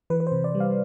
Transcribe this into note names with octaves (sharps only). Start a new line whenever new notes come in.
E3 B4
B4
C5
C3
D5
G3
F5